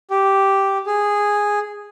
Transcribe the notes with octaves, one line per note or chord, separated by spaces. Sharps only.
G4
G#4